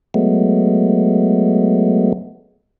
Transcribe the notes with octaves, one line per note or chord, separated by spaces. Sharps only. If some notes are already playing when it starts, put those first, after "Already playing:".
F#3 G#3 A3 B3